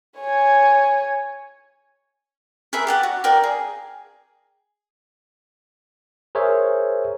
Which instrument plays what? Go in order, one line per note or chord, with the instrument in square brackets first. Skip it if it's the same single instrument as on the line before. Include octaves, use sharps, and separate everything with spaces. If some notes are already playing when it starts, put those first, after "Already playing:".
[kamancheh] C#5 G#5
[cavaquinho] G#4 A#4 B4 E5
G4 D5 F#5
F#4
A#4 D5 F5 G5
G#4
[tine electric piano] G#4 A#4 C5 C#5 E5